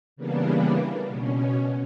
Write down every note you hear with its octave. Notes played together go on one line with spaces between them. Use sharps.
C#3 E3 G3 A#3 B3 D4
B2 C#4